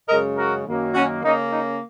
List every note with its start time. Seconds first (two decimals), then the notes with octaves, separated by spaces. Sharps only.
0.08 F#2 C#3 G#3 A#4 D#5
0.37 F#4 A#4
0.66 F#2 D#3 F#3 A#3 C#4
0.95 C#4 F#4
1.23 C#3 A#3 C#4 D#4
1.52 D#4